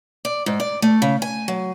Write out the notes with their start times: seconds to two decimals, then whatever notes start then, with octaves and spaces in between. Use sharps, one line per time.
0.25 D5
0.46 G#2
0.60 D5
0.82 A3
1.02 C#3
1.22 G#5
1.48 F#3